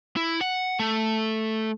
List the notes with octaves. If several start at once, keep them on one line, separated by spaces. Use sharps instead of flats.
E4
F#5
A3